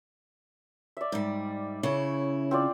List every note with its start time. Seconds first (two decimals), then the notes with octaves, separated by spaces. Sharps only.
0.97 D5 E5
1.12 G#2 G3
1.83 C#3 E4 C#5
2.51 C4 F4 D5